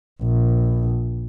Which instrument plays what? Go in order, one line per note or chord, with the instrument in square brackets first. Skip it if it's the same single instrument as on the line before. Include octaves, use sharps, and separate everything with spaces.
[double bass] A#1